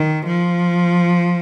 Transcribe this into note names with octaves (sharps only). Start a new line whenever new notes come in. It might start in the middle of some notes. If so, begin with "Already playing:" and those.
Already playing: D#3
F3